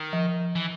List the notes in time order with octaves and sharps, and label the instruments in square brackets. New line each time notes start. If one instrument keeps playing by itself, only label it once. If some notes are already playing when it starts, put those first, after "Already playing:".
Already playing: [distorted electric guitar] D#3
[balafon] F3
[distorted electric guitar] E3